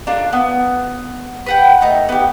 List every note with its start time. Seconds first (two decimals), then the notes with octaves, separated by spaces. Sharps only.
0.07 D4 F4 A4 A#4
0.33 B3
1.46 B4 F#5 G5
1.81 A3 D#4
2.09 B3 G4